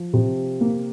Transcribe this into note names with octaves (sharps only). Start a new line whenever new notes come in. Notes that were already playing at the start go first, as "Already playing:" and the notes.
Already playing: F3
C3
A#3